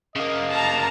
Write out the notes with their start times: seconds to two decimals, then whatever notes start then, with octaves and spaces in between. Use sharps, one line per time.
0.16 C#3 A#3 D#5
0.53 A5 A#5